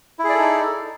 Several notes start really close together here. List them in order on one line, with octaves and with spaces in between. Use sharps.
E4 G#4 D5 A4 D#4